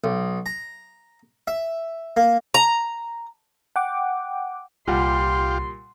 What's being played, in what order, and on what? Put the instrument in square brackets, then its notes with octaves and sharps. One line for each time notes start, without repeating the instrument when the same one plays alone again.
[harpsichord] B1
A#5
E5
A#3
[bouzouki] A#5
[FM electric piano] F#5 G5 D6
[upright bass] C2 [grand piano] A#2 G3 F#5 [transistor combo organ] F4 G4 [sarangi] C6